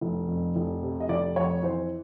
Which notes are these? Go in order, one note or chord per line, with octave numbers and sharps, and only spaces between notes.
F1
F2
F1
C3
D#5
F1 D5
F2 C#5
E3 C5